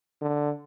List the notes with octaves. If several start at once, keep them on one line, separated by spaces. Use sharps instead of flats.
D3